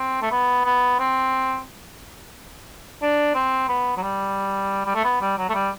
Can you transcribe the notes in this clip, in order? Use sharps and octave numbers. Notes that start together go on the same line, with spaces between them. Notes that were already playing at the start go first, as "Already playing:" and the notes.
Already playing: C4
A3
B3
B3
C4
D4
C4
B3
F#3
G3
G3
A3
B3
G3
F#3
A3
G3